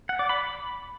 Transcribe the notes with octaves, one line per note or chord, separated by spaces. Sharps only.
F#5
D5
B5
B5